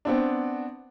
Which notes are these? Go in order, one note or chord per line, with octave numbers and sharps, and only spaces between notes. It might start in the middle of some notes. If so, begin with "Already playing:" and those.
B3 C4 D4